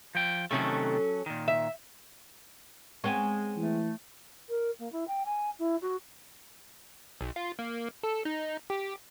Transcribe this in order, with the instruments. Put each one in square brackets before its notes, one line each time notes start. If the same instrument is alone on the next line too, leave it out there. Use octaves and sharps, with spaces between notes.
[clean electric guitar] F3 G5
[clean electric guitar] C3 D#3 A3 [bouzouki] F#3 C#4 A4
[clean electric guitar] A#2 D#3
[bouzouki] E5
[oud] G#3 B3 C4 [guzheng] C#5 G#5
[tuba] E3 [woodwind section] A3
[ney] A#4
A#3
E4
G5
G#5
E4
F#4
[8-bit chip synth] B1
F4
A#3
A4
D#4
G4